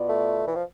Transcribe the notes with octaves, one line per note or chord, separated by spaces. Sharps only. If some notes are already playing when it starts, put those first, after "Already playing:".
Already playing: B2 B3 F4 B4 D5
A3
E3
F3